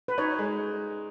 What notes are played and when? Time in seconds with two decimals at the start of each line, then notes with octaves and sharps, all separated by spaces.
0.08 B4
0.18 D#4 C#5
0.39 G#3